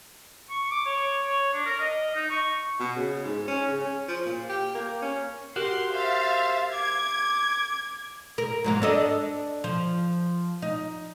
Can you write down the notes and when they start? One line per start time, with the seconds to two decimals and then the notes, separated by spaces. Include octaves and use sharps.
0.50 C#6
0.71 D6
0.86 C#5
1.27 C#5
1.53 D4
1.66 A#4
1.80 D#5
2.15 D#4
2.30 C#6
2.80 B2
2.96 C#3
3.25 G#2
3.48 C#4
3.68 C#3
3.81 C#4
4.08 F3
4.26 A#2
4.49 G4
4.75 A#3
5.02 C#4
5.56 F#4 G4 A#4 C6
5.92 C5 E5 F5 A6
6.74 D6 G#6
8.38 A#4
8.64 G#2 F#3 A#3
8.82 D4 A4 D#5
9.64 F3
10.62 D#4